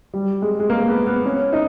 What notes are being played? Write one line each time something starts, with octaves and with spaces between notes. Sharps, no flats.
G3
G#3
G#3
A#3
B3
B3
C#4
D#4